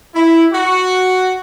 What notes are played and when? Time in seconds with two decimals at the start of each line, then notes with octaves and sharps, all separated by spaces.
0.15 E4
0.53 F#4